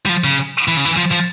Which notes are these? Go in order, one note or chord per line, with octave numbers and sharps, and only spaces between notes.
G3
F3
C#3
E3
C#3
E3
F3
F3